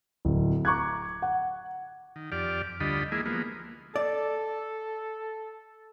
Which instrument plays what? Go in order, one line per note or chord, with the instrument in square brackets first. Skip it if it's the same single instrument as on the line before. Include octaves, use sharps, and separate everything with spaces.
[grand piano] D1
A#5 C#6 D6 F#6 G#6
F#5
[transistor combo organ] D#3
F2 G4 D5 F6
D2 D3 G3 F4 D#5 B5
E3 G#3 A#3 E4 G#4
F3 G#3 A#3 B3
[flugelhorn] A4 [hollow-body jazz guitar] D5